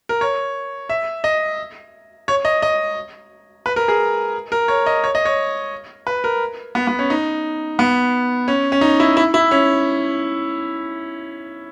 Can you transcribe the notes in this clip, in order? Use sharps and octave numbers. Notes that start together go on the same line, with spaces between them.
A#4
C#5
E5
D#5
C#5
D#5
D#5
B4
A#4
G#4
A#4
C#5
D#5
C#5
D#5
C#5
B4
A#4
B3
B3
C#4
D#4
B3
C#4
C#4
D#4
E4
E4
E4
C#4